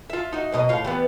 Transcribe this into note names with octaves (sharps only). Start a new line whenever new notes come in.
F4 E5
D#4 F#4
F#2 B2 D#5
A2 C#3 F4
E3 G3 B3